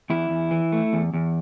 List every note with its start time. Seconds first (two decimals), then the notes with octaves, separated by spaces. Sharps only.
0.10 E2 E4
0.30 E2
0.51 E3
0.72 A3
0.93 E2
1.13 E2